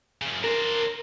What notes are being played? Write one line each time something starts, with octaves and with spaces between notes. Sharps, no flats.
F#2 C#3
D4 A#4 C5